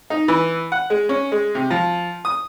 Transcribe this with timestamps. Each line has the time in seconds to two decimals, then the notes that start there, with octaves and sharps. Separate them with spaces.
0.10 D#4
0.28 E3
0.72 F#5
0.90 G#3
1.09 C#4
1.32 G#3
1.55 C3
1.70 F3
2.25 D#6